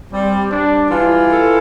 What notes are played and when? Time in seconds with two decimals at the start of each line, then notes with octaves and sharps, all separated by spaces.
0.12 G3 C4
0.51 G3 D4
0.90 E3 F4
1.30 A4